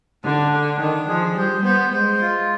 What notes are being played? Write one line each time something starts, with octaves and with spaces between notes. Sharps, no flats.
D3 D4
D4
D#3 D4
F3 G#4
G3 C5
B3 C5
G#3 C5
F4